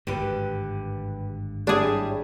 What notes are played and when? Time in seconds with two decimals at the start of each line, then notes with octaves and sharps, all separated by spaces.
0.07 G#1 G2 D3 G4 B4
1.67 G3 D4 E4 G4 G#4 C#5